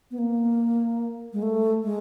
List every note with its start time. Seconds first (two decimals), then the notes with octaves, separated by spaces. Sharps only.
0.11 B3
0.18 A#3
1.33 G#3
1.42 A3
1.84 G#3